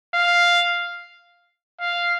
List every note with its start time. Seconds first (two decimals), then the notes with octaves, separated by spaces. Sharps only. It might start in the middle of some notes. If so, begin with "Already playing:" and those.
0.15 F5
1.81 F5